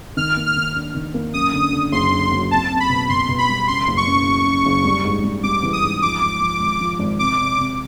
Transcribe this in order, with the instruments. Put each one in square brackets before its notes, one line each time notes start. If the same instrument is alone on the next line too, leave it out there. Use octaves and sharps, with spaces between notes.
[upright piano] D#3 [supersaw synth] F6
[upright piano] A#3
[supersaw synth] F6
[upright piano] D#3
D4
D#3
A#3
[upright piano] F#2 [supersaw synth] D#6
[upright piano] D3
D3
[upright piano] F#1 [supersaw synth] C6
[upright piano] D3
F#3
[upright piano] C4 [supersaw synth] A5
[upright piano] C4
[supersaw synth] B5
[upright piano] B2
[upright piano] B2 [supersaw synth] C6
[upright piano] B2
[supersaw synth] B5
[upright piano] G3
[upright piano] C#3 [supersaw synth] C6
[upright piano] F#1
[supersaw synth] C#6
[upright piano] F#2
C#3
C#3
F#1
G3
G#2
G3
[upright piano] G3 [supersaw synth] D6
[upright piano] E3
[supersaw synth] D#6
[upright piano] G#2
[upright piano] F3 [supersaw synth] D6
[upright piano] G#2
F3
G#1
F3
G#1
[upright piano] C3 [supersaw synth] D6
[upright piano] C3
C3